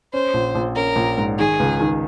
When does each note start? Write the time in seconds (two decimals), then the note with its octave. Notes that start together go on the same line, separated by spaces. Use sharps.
0.13 C#4 C5
0.34 A#1
0.55 A#1
0.76 C#4 A#4
0.96 A#1
1.17 G#2
1.38 D#3 G#4
1.59 C#2
1.80 D#3